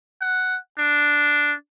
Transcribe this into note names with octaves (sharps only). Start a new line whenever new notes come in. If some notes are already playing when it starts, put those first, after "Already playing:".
F#5
D4